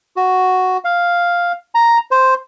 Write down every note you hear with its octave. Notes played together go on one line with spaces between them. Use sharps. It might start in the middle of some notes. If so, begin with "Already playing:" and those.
F#4
F5
A#5
C5